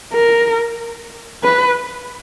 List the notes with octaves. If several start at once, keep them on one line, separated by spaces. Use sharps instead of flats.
A#4
B4